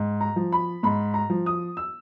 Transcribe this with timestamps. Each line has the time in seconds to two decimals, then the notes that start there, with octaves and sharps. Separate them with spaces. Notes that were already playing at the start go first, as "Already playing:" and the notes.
Already playing: G#2
0.21 A#5
0.36 F3
0.52 B5
0.83 G#2 B5
1.14 A#5
1.30 F3
1.46 D#6
1.77 E6